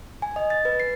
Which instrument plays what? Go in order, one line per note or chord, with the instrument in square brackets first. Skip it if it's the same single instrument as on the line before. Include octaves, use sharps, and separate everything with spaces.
[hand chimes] G#5
D#5
A6
B4
C7